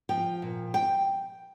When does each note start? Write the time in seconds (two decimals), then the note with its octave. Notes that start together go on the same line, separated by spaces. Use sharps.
0.09 F3 G5
0.42 A#2
0.74 G5